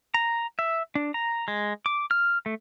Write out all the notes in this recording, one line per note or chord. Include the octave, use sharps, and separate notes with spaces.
A#5
E5
D4
A#5
G#3
D6
F6
A3